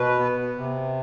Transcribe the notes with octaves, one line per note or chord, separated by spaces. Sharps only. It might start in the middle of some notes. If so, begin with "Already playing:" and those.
Already playing: B2 B4
B3
C3